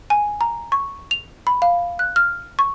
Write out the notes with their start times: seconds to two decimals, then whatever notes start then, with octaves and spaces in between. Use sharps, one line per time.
0.10 G#5
0.41 A#5
0.72 C#6
1.11 F7
1.47 B5
1.62 F5
1.99 F#6
2.16 F6
2.59 C#6